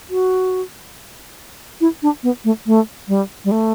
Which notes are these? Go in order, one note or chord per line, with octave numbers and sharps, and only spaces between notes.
F#4
E4
D4
B3
A3
A3
G3
G3
A3